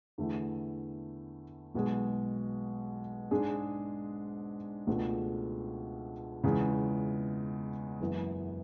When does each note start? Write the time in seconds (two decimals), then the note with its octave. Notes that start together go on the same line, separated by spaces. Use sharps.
0.18 E2 D3 A3 E4
1.74 B1 B2 G#3
3.31 G#2 G#3 D4 G#4
4.87 C#2 B2 A3 D4 G#4
6.44 E2 C#3 G#3
8.00 F#1 F#2 E3 B3